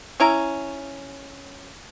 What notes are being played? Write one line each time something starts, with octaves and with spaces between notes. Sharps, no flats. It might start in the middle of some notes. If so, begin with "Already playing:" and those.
C#4 E4 A#5